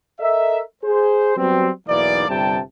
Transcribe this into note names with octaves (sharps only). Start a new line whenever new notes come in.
A4 A#4 D#5 E5
G#4 C5
F#3 G3 B3 C4
B1 E2 E3 A#3 D#4 D5
G1 C3 G3 G5 A5